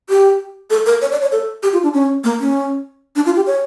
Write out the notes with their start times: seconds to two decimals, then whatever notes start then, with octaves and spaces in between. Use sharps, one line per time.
0.10 G4
0.70 A4
0.86 A#4
1.02 C#5
1.12 D5
1.22 C#5
1.32 A4
1.63 G4
1.73 F4
1.83 D4
1.94 C#4
2.24 A#3
2.40 C#4
3.16 D4
3.26 F4
3.36 G4
3.47 C#5